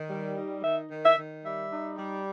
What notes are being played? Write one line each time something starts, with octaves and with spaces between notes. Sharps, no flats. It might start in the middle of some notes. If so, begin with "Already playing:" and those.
Already playing: D#3
G3
D#4
D#3 E5
D#3
E5
D#3
G3 E5
D#4
G3